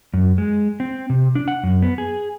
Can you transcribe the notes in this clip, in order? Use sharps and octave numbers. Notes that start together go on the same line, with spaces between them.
F#2
G#3
C4
C3
D4
F#5
F#2
B3
G#4